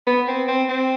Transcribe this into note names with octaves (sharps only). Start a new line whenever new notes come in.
B3
C4
C4
C4